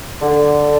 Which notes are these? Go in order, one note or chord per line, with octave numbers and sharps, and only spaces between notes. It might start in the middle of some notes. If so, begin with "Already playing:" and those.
D3